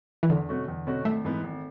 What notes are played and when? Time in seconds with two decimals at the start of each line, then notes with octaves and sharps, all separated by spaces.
0.23 E3
0.30 E2 D3
0.49 B2 A3 C#4 F#4
0.68 E2
0.87 B2 A3 C#4 F#4
1.05 G#1 A3
1.25 G#2 E3 B3
1.43 G#1